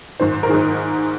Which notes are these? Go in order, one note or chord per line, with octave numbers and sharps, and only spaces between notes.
G#2 D#3 C5
A#4
G#2 D#3 G#4